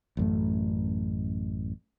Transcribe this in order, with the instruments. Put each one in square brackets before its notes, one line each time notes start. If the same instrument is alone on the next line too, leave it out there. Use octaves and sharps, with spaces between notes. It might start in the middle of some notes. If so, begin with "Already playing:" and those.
[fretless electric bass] A1 F#2 A3